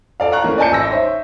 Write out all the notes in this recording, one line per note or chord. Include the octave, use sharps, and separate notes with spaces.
A4 D5 F5
F5 A#5 C#6 F#6
E3 A3 A#3 C#4
D5 D#5 G#5 A5 G6 C#7
A1 E6 A#6
D#4 C5 C#5 E5